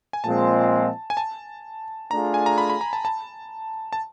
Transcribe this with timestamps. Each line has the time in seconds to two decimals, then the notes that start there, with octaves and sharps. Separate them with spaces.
0.13 G#5
0.23 A#2 F3 G#3 C4 A5
1.10 G#5
1.17 A5
2.11 A3 D4 F4 G#4 A#5
2.34 G#5
2.46 A#5
2.58 B5
2.70 B5
2.81 A#5
2.93 A5
3.05 A5
3.93 A5